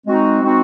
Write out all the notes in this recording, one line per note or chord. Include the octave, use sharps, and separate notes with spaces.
G#3 C4 D#4 F#4
G#3 C4 D#4 F#4